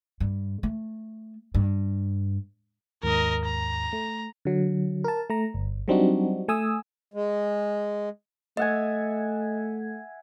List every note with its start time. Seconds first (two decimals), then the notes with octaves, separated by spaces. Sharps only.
0.20 G2
0.63 A3
1.54 G2
3.03 D#2 G#2 A#4 D#5
3.45 A#5
3.93 A3
4.45 D3 F#3
5.04 A#4 A5
5.30 A3 A#5
5.54 G1
5.88 F#3 G3 C4 D4 D#4 F#4
6.48 A3 G#5 D#6 E6
7.14 G#3
8.57 A3 D#5 E5 F#5 G#5